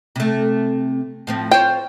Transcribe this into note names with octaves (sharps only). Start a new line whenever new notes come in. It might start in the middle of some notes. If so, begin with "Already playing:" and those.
C3 A3
A2 F3 C4
F4 C5 C#5 G5